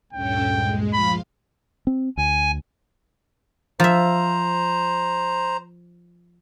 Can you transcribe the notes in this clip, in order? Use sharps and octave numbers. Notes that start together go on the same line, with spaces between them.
D2 G2 A#2 C#4 A4 G5
G#3
F3 F4 F5 B5
C4
D2 G#5
F3 C5 E5 A#5